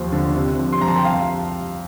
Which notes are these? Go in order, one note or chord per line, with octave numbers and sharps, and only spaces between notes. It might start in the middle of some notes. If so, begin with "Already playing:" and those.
Already playing: D#2 F3
D3
C3
F3
C6
F2 A#5
A5
G5
C2 F5